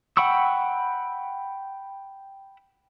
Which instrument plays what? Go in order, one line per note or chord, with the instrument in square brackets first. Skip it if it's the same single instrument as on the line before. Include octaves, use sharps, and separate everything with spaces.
[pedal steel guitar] F#5 G5 B5 C#6 E6